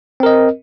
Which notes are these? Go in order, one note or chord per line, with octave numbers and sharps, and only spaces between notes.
C4 A#4 D#5